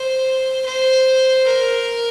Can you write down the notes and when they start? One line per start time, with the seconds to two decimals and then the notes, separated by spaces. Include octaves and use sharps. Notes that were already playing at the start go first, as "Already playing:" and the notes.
Already playing: C5
0.65 C5
1.45 A#4